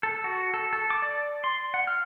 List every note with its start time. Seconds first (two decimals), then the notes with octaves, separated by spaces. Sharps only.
0.03 A4
0.24 F#4
0.54 A4
0.73 A4
0.90 D6
1.02 D5
1.44 C6
1.74 F#5
1.87 F6